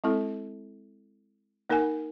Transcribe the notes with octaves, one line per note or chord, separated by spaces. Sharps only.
G#3 C4 E4 A4
A#3 D#4 A#4 F#5 G#5